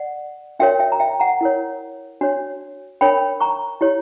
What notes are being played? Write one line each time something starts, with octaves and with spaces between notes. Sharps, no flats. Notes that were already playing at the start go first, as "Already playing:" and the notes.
Already playing: D5 F#5
D4 F#4 A#4 C#5 E5 G5
E5 G5
A#5
E5 G5
F#5 A#5
E4 A#4 C#5
D4 F#4 C#5
D4 A#4 C#5 G5 B5
A#5 C#6
E4 G4 C#5